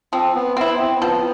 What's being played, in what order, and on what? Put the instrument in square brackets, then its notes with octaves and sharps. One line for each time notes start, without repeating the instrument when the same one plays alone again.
[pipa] F3 [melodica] C4
[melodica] B3
[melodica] B3 [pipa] C4 E4
[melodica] C4
[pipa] F3 [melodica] B3